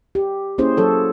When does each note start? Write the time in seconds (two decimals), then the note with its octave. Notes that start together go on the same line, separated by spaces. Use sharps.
0.15 G4
0.58 A#3 C#4 E4 G#4 C5
0.77 F#3 A4 C#5